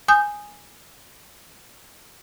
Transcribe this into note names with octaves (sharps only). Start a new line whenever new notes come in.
G#5 D#6 G6